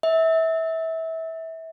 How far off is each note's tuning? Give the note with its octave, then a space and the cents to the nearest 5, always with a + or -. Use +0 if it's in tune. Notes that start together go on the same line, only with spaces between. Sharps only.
E5 -25